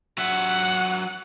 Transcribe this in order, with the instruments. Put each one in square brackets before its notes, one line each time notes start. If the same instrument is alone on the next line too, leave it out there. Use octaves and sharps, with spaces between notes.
[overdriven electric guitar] F#3 E5 [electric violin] F#5